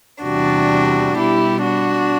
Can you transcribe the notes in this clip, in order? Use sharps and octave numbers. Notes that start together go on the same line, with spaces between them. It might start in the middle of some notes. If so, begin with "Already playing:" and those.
E2 C3 E3 G3 D4 F#4
B2 G3 B3 E4 G4
D4 F#4